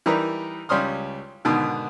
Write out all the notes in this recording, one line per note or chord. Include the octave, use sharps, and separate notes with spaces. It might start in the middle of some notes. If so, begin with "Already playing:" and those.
E3 G3 D#4 A#4 B4
C#2 G3 C#4 C6 D#6 F6
G#2 B2 D3 D#3